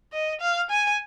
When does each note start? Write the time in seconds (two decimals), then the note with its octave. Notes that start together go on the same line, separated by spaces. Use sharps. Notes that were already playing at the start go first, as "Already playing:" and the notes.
0.13 D#5
0.41 F5
0.70 G#5